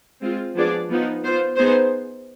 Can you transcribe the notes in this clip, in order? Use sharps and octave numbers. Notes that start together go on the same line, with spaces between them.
G#3 C4 F4
F3 B3 D4 G#4 D5
F3 B3 D#4
B3 F4 C5
B3 D#4 G#4 C5